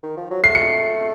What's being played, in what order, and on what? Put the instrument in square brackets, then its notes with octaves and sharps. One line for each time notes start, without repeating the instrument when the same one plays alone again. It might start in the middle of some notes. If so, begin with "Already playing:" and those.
[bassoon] D#3
F3
F#3
[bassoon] A3 [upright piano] C7
[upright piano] C#7